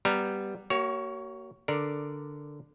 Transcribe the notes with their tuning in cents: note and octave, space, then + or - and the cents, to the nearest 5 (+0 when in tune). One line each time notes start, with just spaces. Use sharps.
G3 +0 B3 +0 A#5 +0
A#3 -10 F#4 +40 C#5 +10
D3 +0 A#4 +5 D5 +0